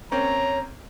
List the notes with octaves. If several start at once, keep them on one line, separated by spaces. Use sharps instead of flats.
A#3 C4 C#4 C#5 A#5